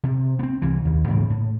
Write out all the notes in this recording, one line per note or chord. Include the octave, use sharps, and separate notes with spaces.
C3
B3 C4
C2 E3
D#2
G#2 C#3 E3 A#3
A2